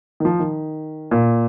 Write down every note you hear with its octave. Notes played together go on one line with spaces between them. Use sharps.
D#3
F3
D#3
A#2